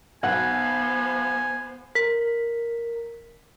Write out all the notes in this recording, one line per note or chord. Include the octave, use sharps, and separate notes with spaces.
B1 B3 C5 F#5 G#5
A#4 B6